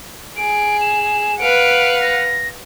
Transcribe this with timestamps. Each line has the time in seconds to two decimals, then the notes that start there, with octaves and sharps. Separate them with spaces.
0.37 G#4 D7
0.81 E7
1.39 B4 F5 F#5 D7
2.02 A#6